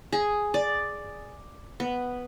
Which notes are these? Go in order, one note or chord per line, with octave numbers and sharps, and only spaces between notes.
G#4
D5
B3